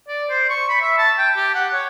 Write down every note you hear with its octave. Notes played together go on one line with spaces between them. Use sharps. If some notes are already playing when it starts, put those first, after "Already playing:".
D5
C5
C#6
B5
E5
A5
G5
G4
F#5
C#5